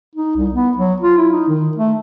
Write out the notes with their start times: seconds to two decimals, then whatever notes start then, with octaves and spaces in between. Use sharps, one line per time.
0.15 D#4
0.36 C2
0.54 B3
0.77 F#3
1.02 F4
1.17 E4
1.32 D#4
1.48 D#3
1.77 A3